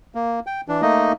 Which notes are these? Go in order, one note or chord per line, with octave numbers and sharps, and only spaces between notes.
A#3
G5
E3 D4
A3 A#3 D#4 D#5